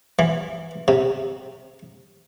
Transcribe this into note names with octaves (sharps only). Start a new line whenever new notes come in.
E3
C3